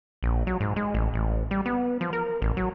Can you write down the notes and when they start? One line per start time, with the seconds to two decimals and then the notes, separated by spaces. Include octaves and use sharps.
0.23 A#1
0.47 F#3
0.60 G#2
0.76 G#3
0.94 A1
1.14 A1
1.51 G3
1.66 B3
2.01 F3
2.13 A#4
2.42 A1
2.57 F#3